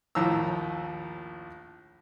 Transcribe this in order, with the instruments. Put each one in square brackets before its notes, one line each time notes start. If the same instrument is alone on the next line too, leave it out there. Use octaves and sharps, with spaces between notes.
[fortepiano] A#1 D#2 A2 A#5 E6